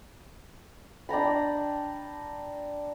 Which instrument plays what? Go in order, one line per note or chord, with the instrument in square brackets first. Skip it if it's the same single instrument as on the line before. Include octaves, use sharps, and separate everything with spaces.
[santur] D4 G5 A#5 B5